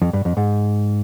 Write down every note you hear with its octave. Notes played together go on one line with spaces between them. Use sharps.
F2
G2
F2
G#2